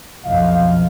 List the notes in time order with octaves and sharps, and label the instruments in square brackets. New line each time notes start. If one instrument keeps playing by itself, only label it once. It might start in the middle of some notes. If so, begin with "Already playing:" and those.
[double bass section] B1 F2 [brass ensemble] D#5 F5